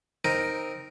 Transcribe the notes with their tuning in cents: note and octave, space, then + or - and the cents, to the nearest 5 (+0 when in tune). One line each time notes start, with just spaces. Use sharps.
C4 +0 D#4 +0 A#4 +0